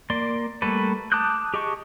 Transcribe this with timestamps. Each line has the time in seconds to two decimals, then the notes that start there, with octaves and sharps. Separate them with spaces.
0.10 A#3 D5 C6
0.62 G3 A3 A#3 A4 B4
1.12 A5 D6 D#6 F#6 G6
1.54 G4 G#4 D#5 A5 C#6